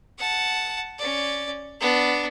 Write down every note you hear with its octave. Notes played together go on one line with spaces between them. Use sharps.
F#5 A5
C#4 D5
B3 D4